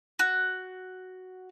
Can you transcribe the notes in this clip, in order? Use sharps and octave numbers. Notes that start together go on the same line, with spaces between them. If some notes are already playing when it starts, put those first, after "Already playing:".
F#4